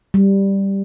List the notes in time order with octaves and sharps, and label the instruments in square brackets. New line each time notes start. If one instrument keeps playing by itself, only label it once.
[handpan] G3